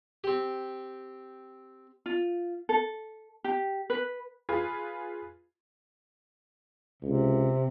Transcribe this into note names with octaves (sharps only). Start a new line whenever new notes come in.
C4 G4
F4
A4
G4
B4
F4 G#4 B4
C#2 C3